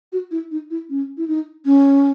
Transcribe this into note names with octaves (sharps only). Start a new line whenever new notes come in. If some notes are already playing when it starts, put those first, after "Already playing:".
F#4
E4
D#4
E4
C#4
E4
D#4
C#4